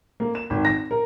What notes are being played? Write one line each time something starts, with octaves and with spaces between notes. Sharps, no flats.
A#3
E7
G#1
A#6
A#4